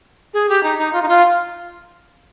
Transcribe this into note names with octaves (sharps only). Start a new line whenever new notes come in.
G#4
G4
D#4
D#4
F4
D#4
F4